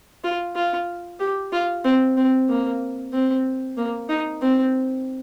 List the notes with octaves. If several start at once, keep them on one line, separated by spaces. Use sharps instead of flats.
F4
F4
G4
F4
C4
C4
A#3
C4
A#3
D#4
C4